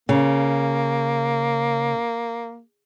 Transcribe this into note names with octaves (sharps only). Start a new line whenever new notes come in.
C#3 A#3